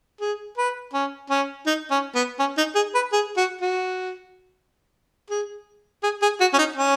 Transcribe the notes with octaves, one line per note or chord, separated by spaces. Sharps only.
G#4
B4
C#4
C#4
D#4
C#4
B3
C#4
D#4
G#4
B4
G#4
F#4
F#4
G#4
G#4
G#4
F#4
C#4
D#4
C#4